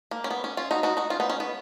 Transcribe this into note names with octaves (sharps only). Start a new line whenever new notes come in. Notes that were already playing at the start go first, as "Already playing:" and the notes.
A#3
C#4
B3
C#4
C#4 F4
D#4 F#4
D#4 F#4
D#4 F#4
C#4 F4
B3 D#4
C#4
B3